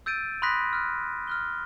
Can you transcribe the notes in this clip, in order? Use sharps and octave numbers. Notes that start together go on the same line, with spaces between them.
E6 G6 A6 D7 D#7
B5 C6 D#6 F#6 A#6 B6
F6 F#6
F6 F#6 G7